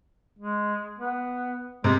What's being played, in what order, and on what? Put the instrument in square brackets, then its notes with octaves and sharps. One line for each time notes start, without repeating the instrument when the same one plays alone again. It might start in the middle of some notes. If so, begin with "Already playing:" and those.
[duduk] G#3
B3
[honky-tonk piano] C3 [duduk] G#3